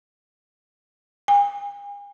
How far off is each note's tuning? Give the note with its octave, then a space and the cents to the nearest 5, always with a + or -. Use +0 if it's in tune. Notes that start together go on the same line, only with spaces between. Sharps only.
G#5 -45